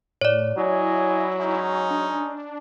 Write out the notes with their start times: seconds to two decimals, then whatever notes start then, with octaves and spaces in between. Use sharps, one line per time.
0.21 A2 C#5 D5
0.57 F#3 E4 D#5 G#5
1.40 G#3 C#4 D#4
1.91 D4